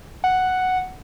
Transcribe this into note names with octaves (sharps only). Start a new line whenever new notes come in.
F#5